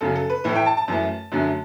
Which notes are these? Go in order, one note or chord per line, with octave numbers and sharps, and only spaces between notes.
F#2 C#3 F#3 A4
A4
B4
A2 E3 A3 B4
G5
A5
A5
F#2 E3 A3
F#2 D3 F#3 A3